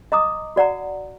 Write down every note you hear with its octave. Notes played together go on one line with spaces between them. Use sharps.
D#5 A#5 D6 D#6
F#4 D5 F#5 A#5